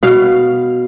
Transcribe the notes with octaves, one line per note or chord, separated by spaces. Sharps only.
B2 F5